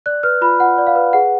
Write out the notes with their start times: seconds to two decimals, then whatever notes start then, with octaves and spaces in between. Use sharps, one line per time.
0.06 D5 F#6
0.23 B4 F6
0.41 F4 B5
0.60 F4 F#5
0.78 D5
0.87 F5
0.96 B4
1.13 G#4 F#5